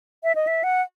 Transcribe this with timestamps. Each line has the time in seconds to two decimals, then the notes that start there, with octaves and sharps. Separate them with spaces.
0.24 E5
0.35 D#5
0.47 E5
0.64 F#5